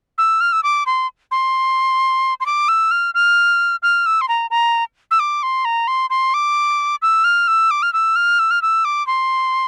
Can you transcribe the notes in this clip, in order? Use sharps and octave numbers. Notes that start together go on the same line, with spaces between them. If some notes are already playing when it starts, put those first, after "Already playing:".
E6
F6
E6
D6
C6
C6
C6
D6
E6
F6
F6
F6
E6
C6
A#5
A#5
E6
D6
C6
A#5
C6
C6
D6
E6
F6
E6
D6
F6
E6
F6
E6
F6
E6
D6
C6